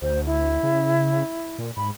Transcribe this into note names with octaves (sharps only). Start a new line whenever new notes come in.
D2 C5
E4
C#3
A#2
G#2 B5